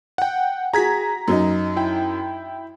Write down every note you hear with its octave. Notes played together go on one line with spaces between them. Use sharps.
F#5 G5
F#4 G#4 A#5 G#6 B6
F#2 F#3 D#4
E4 G5